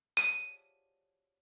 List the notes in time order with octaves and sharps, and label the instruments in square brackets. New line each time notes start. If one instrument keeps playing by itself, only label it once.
[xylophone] D#7